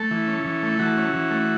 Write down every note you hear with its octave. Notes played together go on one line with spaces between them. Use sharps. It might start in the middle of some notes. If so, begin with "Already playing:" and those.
Already playing: A3 A4
E3
C#4
E3
A3
E3 F#4
C#4
E3
A3